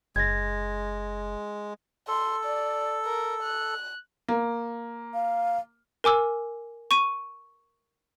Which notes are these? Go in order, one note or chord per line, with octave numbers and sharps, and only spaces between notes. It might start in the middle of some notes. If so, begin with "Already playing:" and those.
F#1 G#3 G#6 A#6
A4 C6
D5
A#4
F#6
A#3
F5
A#4 G#5 D6 E6
C#6 D#7